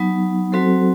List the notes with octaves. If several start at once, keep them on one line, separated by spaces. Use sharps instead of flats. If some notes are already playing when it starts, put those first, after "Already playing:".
Already playing: F#3 B3 D#4
F#3 C4 F#4 A4 C5